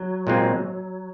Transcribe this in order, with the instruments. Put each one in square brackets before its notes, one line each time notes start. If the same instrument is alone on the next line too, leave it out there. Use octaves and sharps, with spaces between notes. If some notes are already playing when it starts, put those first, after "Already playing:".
Already playing: [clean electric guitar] F#3
[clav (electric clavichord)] A#2 G#3 C4 F4